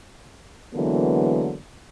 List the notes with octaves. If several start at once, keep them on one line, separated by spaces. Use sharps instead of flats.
D3 E3 F#3 G#3 A#3 B3